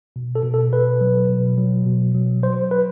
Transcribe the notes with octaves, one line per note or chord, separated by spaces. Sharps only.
B2
A4
B2
A4
B2 B4
F#3
B2
F#3
B2
F#3
F#3 C5
B4